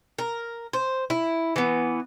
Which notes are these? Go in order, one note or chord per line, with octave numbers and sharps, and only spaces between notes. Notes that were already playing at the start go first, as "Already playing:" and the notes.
A#4
C5
E4
E3 B3